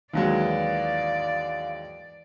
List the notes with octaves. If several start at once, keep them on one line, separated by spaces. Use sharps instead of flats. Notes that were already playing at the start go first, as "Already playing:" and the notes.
D#2 E3 F#3 G#3 D5 F5